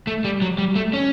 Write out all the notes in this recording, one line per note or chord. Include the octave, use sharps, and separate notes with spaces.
A3
G3
F#3
G3
A3
C#4